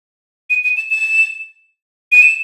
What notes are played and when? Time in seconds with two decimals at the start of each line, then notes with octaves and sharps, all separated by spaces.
0.50 D#7
0.64 D#7
0.77 E7
0.90 E7
2.12 D#7
2.22 E7